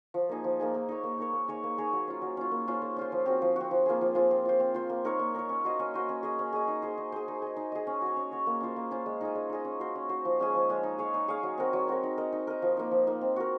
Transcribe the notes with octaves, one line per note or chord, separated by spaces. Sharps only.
F3
A#3 D#4 G#4
F3
A#3 D#4 G#4
A#3
D#4 A#4 C#5
A#3
D#4 A#4 C#5
A#3
D#4 G#4 C#5
A#3
D#4 G#4 C#5
F#3
C#4 F4
F#3
C#4 F4
A#3
C#4 F4 C5
A#3
C#4 F4 C5
F3
C4 F#4
F3
C4 F#4
F3
A#3 F4 G#4
F3
A#3 F4 G#4
C4
F4 C5
C4
F4 C5
A#3
D#4 A#4 C#5
A#3
D#4 A#4 C#5
C#4
F#4 C5 D#5
C#4
F#4 C5 D#5
C#4
G#4 D#5
C#4
G#4 D#5
D#4
G#4 C5
D#4
G#4 C5
D#4
G#4 D#5
D#4
G#4 D#5
C#4
F#4 C#5
C#4
F#4 C#5
A#3
C#4 F4 C5
A#3
C#4 F4 C5
G#3
D#4 G#4 D#5
G#3
D#4 G#4 D#5
C#4
F#4 C5
C#4
F#4 C5
F3
G#3 C#4 G#4
F3
G#3 C#4 G#4
D#4
G#4 C#5 F5
D#4
G#4 C#5 F5
F#3
C4 F#4 A#4
F#3
C4 F#4 A#4
D#4
A#4 D#5
D#4
A#4 D#5
F3
A#3 D#4
F3
A#3 D#4
C4
F#4 A#4